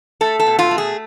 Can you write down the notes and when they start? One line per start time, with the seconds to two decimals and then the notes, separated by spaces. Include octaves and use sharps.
0.21 A3 A4
0.39 A4
0.46 B2
0.59 F4
0.71 A3
0.78 G#4